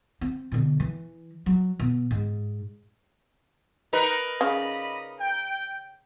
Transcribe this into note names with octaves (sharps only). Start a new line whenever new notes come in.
C4
B2 D3
E3
F#3
B2
G#2
D#4 A#4 B4
C#3 D5 D#5 B5
G5